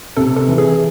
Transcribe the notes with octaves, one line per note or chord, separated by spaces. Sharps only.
C3 A4
A4
E3
G#4